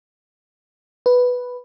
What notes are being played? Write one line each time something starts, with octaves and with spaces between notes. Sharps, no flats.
B4